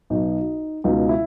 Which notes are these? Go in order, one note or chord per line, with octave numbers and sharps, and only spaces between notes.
B1 B2 D#4
C#2 B2 D#4
E4